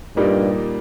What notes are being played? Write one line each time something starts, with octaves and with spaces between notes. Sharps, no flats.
G2 A#2 G3 A#3 D#4